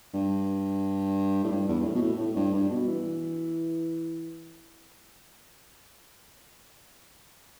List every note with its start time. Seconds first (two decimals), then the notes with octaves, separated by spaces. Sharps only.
0.14 G2
1.44 A2
1.51 G2
1.68 E2
1.81 G2
1.85 A2
1.95 B2
2.02 A2
2.20 A2
2.36 G2
2.54 G2
2.71 B2
2.88 E3